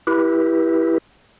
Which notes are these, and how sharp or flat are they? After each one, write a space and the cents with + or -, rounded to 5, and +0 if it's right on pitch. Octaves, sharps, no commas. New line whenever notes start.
E4 +0 G4 +0 B4 -30